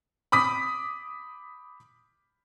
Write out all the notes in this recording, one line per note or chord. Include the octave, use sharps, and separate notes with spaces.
B5 D6 D#6 B6